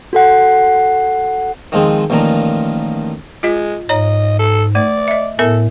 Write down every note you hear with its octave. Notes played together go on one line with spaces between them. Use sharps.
F#4 A4 F#5
D#3 F3 G#3 C4
A1 A#2 D#3 F3 A#4
G#3 F4 D#5
G#2 C#5 D#5 A#5
A4
A3 D5
D#5 E5
A2 B3 A4 A#4 E5